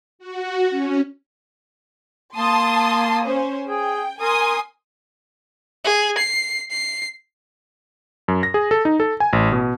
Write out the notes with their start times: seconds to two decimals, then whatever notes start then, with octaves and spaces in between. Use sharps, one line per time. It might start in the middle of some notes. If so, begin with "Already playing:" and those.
0.19 F#4
0.70 C#4
2.36 A#3 A5 C6 D#6
3.24 C#4 C5
3.68 G#4 G5
4.20 A#4 G#5 C6 D#6
5.84 G#4
6.18 C7
6.70 C7
8.28 F#2
8.43 A#6
8.54 G#4
8.71 A4
8.85 D#4
9.00 A4
9.20 G#5
9.33 A1
9.52 B2